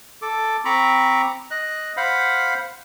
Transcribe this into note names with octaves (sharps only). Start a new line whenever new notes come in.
A4 D6
C4 A#5 B5 C#6 D6
D#5 F#6
C5 F5 F#5 B5